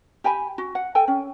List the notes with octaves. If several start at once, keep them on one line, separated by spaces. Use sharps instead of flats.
G4 G5 G#5 B5
F#4
F#5
A4 G5 G#5
C#4